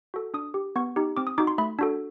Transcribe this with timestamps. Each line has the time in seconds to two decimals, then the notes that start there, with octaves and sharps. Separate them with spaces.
0.14 F#4 A4
0.34 D4 D#6
0.54 G4
0.76 B3 C#6
0.96 D#4 G4
1.17 C4 D6
1.27 D#6
1.38 D#4 F#4 D6
1.47 C6
1.58 A3 B5
1.79 D4 F#4 A4